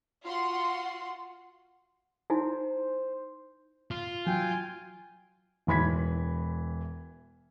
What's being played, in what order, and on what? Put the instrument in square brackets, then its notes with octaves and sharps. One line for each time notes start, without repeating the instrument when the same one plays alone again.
[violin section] F4 F#4 F#5 C6
[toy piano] D#4 E4 G#5 [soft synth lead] C5
[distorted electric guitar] F4
[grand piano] F#3 [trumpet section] G5 G#5
[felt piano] E1 E3 B5 G#6 B6